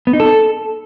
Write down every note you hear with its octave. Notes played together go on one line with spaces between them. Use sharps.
B3
D#4
A4